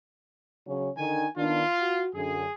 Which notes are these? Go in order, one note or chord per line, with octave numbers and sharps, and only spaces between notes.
C#3 F#3 C#4
D3 D#3 G#5
D#3 B3 D4 F4
F#4
F#2 D3 G#4